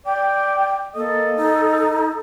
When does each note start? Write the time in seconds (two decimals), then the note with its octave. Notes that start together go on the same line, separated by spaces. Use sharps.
0.06 D5 G5
0.95 A#3 A4 D#5
1.36 D#4